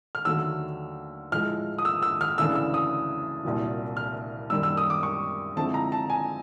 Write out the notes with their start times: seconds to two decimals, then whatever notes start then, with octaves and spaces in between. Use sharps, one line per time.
0.15 F6
0.25 D#2 D3 F#3 A3 E6
1.32 A2 F3 G#3 F6
1.78 D#6
1.85 E6
2.02 E6
2.21 F6
2.38 D2 C#3 E3 A3 D4 E6
2.55 E6
2.74 D#6
3.45 C2 A#2 F#3
3.97 F6
4.50 F#2 D#3 G3 A#3 E6
4.63 E6
4.77 D#6
4.90 D6
5.03 C#6
5.56 D3 F3 G#3 C4 E4 A5
5.74 A#5
5.92 A5
6.10 G#5